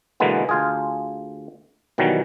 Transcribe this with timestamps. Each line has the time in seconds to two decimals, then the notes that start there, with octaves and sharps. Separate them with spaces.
0.20 B2 D3 E3 G#3 A#3 B3
0.49 D2 F4 G#4
1.98 B2 D#3 E3 F#3 G3